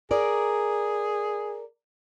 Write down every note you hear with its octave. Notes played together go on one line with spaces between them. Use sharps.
G#4 A#4 D5